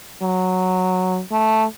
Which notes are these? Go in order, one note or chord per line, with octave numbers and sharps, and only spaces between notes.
F#3
A3